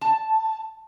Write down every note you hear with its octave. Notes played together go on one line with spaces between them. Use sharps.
A5